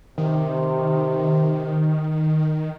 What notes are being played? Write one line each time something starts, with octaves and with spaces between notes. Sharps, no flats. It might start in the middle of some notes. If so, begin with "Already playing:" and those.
C3 D#3